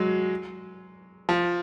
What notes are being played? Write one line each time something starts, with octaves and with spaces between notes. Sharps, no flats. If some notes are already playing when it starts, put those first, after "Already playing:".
Already playing: F#3 G#3
F3